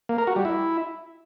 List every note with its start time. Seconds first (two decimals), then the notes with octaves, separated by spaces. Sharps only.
0.09 A#3
0.18 A#4
0.27 F#4
0.36 G3
0.45 E4